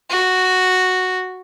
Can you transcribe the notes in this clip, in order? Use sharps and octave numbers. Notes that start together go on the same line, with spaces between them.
F#4